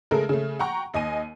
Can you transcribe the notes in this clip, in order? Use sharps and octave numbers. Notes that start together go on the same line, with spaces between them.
C#3 G#3 A3 A4 A#4
C#3 A3
F#5 G5 A#5 C#6
D#2 D#5 G#5 D#7